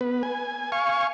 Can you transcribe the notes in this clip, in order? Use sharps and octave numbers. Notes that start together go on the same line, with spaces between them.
B3 B4
G#5
F5 G#5 C#6